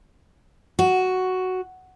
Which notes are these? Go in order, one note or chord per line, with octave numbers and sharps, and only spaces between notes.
F#4